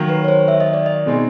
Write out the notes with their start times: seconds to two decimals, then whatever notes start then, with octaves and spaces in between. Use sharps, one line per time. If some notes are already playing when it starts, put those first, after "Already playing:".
Already playing: D#3 F#3 A#3
0.09 B4
0.24 C#5
0.28 C5
0.48 E5
0.60 D#5
0.74 D5
0.86 D#5
1.06 B2 G#3 C4 D#4 G#4